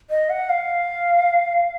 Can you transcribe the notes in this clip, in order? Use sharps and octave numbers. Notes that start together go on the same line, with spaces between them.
D#5
F#5
F5